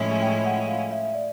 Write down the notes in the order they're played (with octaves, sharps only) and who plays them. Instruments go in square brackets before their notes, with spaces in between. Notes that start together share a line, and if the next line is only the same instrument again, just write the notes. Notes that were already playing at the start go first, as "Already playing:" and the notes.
Already playing: [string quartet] A2 F3 G#3 C#4 E4
[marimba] G5
F#5
F5
E5
D5